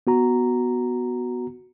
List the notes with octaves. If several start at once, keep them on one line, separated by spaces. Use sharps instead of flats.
B3 F#4 A#5